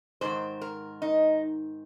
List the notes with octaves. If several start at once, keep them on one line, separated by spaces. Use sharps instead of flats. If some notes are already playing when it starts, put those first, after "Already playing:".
G#2 D#3 C5
A#4
D#4